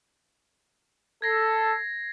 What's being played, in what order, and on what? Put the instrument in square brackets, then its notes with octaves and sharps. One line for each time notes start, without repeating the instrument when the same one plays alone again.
[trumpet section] A4 [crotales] G#6 A#6 C7